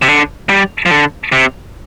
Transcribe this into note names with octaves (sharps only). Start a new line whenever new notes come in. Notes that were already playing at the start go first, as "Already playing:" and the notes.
C3
D3
G3
F3
D3
C3